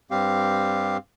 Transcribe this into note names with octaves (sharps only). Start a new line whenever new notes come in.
G2 G3 C4 G4 F5